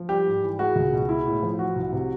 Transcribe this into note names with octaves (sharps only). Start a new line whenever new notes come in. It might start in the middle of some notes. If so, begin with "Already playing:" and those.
Already playing: F3
G3 G4
G#2
E3
G#3 F#4
C#2
B2
G#3 E4
A2
F3
E3 F#4
C2
C3